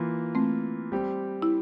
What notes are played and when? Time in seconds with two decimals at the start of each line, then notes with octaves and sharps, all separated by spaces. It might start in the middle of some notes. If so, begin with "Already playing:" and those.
Already playing: E3 A#3 F4
0.35 A3 C4
0.92 G3 C4 G4
1.42 E4